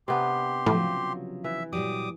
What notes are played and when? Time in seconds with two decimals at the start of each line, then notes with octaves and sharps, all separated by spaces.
0.08 C3 B3 D4 G4 C6
0.66 A2 C#3 F3 F#3
1.44 E3 E5
1.73 A#2 F#3 G3 D6 D#6